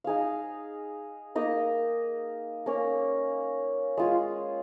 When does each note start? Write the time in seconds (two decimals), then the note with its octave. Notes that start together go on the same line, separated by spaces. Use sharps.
0.04 D#4 G#4 F5
1.35 A#3 D#4 A#4 D#5
2.66 A#3 C#4 A#4
3.97 G#3 F4 G#4